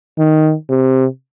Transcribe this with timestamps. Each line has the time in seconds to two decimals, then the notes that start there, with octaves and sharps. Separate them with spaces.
0.18 D#3
0.70 C3